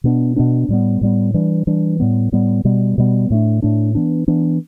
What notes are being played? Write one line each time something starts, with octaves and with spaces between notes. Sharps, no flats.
B2 B3 D4
B2 B3 D4
A2 G3 B3
A2 G3 B3
E3 G3 D4
E3 G3 D4
A2 G3 B3
A2 G3 B3
B2 G3 B3
B2 G3 B3
A2 A3 D4
A2 A3 D4
E3 B3 D4
E3 B3 D4